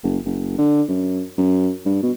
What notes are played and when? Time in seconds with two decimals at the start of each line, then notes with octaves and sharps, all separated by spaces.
0.04 F#1
0.25 F#1
0.58 D3
0.88 F#2
1.38 F#2
1.86 G2
2.03 B2